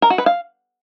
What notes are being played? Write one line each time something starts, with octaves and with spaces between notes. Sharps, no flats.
A#4
F#4
B4
F5